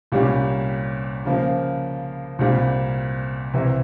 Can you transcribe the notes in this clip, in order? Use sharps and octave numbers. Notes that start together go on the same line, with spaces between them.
C2 A#2 G3 C#4 G4
C#3 F3 A#3
C2 A#2 G3 C4
C2 C3 E3